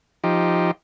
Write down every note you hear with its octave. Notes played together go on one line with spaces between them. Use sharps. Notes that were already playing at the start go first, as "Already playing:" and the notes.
F3 D#4 G4